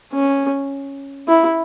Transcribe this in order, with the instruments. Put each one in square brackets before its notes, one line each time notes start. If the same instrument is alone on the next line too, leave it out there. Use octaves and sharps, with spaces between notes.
[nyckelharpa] C#4
E4